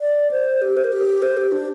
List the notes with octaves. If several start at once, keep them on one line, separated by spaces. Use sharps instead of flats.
D5
C5
G4
C5
A#4
G4
C5
G4
D4